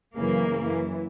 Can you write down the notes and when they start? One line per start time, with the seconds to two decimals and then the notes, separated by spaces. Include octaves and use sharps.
0.17 F#2 C#3 E3 A#3
0.57 F#2 E3